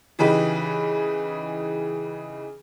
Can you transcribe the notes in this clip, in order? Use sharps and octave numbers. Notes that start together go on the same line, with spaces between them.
C#3 E3 D#4 G4 B4 B5